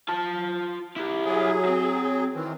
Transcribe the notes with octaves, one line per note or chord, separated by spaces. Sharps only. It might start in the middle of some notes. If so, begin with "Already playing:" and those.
F4 A5
E4 G4
F#3 G#4
C4
D#3 E3 C4